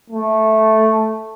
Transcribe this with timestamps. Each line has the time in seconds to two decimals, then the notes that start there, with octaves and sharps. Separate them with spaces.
0.10 A3